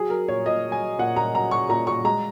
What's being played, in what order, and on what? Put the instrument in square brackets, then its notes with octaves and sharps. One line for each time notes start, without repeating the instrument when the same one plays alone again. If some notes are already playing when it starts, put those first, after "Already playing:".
Already playing: [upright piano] F#3 G#4
F#3 A#4
A#2 C#5
A#2 D#5
F#3
G#5
F#3
A#2 F#5
A#2 A#5
F#3 A#5
F#3 C#6
A#2 A#5
A#2 C#6
G#3 A#5